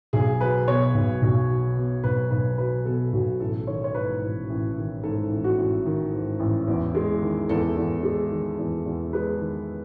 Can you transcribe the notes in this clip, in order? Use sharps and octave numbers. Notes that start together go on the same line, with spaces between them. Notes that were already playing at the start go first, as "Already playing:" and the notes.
B1 G#4
F#3 B4
B2 C#5
B1
B1
F#3
B2
B1 B4
B1 B4
F#3 B4
B2 A4
B1 F#4
A1 A4
D#3 C#5
C#5
G#2 B4
A1
A1
D#3
G#2 A4
A1
F#4
A1
D#3
G#2
A1
E2
G#3
D#3
E2 A4
E2
G#3
D#3
E2
E2
G#3 B4
D#3